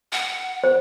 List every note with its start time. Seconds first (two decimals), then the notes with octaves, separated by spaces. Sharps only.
0.12 F#5
0.64 C5